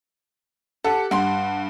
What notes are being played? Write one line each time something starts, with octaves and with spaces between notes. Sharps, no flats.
G4 A4 F#5
G2 F#5 C6